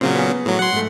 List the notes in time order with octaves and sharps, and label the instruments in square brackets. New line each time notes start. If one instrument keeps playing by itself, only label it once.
[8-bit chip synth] A#2 C#3 F#3 [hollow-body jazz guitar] C4
[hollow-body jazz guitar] B3 G#4
[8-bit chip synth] A2 F#3
[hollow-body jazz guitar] F#3 [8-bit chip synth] F#5 C6
[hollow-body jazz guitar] G#2 A3